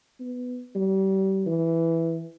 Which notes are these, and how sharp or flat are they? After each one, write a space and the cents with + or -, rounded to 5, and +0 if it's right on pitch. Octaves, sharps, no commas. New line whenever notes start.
B3 +10
G3 -30
E3 +0